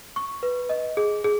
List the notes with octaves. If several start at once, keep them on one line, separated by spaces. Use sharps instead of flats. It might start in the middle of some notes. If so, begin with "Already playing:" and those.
C#6
B4
D#5
G#4
G#4